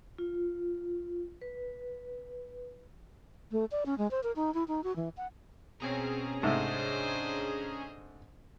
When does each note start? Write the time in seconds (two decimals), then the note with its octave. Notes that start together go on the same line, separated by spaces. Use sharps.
0.18 F4
1.42 B4
3.52 A3
3.71 D5
3.86 C#4
3.98 G#3
4.11 C5
4.23 A#4
4.36 D#4
4.54 E4
4.68 D#4
4.84 F#4
4.96 E3
5.17 F#5
5.80 B2 C4 C#4 G#4 A#5
6.43 G#2 C3 A3 D4 C5 D#5